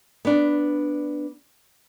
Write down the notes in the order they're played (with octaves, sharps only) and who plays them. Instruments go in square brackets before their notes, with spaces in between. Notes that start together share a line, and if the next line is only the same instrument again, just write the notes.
[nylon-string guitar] B3 D4